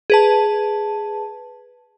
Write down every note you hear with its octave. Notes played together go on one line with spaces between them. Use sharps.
G#4 B4 A5